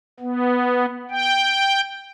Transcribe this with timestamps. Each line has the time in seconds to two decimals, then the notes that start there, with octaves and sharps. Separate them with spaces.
0.20 B3
1.11 G5